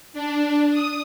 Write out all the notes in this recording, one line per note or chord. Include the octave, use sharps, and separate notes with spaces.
D4
D#6